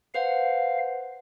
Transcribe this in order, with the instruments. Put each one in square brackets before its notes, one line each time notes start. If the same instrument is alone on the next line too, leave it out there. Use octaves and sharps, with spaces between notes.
[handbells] B4 C5 F#5 [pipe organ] F5